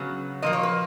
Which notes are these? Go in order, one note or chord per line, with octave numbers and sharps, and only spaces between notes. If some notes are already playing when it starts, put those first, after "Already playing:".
Already playing: C#3 F#3 B3
A#2 F3 A#3 D#5
C#5
B4